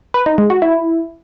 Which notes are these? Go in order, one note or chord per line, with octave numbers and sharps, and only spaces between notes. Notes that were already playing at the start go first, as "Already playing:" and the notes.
B4
D#4
G#3
F#4
E4